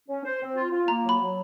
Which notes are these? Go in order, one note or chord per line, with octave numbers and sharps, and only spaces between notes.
C#4
C5
C4
F4
F4
A#3 A#5
F#3 B5
F#3